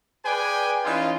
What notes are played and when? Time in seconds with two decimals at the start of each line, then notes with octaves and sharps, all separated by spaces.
0.25 G#4 B4 D5 G5 G#5
0.85 E3 C#4 D#4 F4